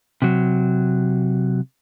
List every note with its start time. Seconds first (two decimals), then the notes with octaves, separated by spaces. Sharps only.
0.22 C3 F#3